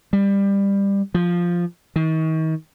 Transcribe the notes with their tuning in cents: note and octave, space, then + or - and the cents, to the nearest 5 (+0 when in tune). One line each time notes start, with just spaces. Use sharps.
G3 +20
F3 +0
D#3 +40